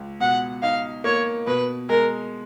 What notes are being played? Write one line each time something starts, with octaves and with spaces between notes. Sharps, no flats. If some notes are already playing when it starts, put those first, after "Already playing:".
Already playing: C#2
B2 F#5
D#4 F5
A#3 C#5
B2 B4
G#3 A#4